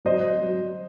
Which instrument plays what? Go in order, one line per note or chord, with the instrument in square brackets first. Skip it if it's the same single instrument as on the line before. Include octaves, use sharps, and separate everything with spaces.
[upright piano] F#3 C5 D#5
F#3